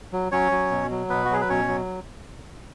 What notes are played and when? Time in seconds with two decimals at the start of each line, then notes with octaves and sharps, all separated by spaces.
0.13 F#3
0.32 F#3 C#4 C#5
0.52 F#3
0.71 B2
0.91 F#3
1.10 B2 B3 B4
1.25 F#4
1.29 F#3 G#4
1.41 B4
1.49 B2 C#4 C#5
1.68 F#3